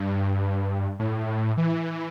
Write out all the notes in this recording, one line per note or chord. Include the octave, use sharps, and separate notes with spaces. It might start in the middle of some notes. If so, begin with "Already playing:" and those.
Already playing: G2
A2
E3